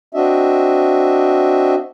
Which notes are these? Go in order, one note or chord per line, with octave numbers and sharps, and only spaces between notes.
C4 D4 F#4 D#5 E5